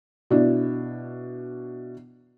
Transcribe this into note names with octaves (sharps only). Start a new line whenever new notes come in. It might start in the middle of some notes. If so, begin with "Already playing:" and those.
B2 D4 E4